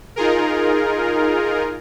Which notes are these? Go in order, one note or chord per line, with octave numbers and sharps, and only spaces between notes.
D#4 F4 G#4 A#4